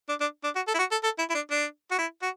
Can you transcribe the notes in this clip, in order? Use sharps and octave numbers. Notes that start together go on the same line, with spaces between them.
D4
D4
D4
F#4
A4
E4
F#4
A4
A4
E4
E4
D4
D4
F#4
E4
F#4